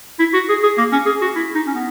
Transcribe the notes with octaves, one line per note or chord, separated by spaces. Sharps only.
E4
F#4
G#4
G#4
A#3
C#4
G#4
F#4
E4
D#4
C#4
B3